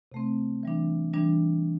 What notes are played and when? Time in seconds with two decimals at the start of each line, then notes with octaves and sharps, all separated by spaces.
0.12 C3 A3 C4
0.63 E3 G3 D4
1.13 E3 G3 D4